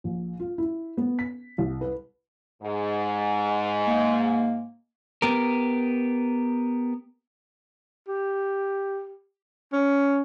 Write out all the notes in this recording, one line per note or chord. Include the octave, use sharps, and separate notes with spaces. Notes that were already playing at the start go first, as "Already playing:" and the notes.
A#1
F4
E4
B3
B6
C2
B4
G#2
A#3
B3 G4 A#4
G4
C#4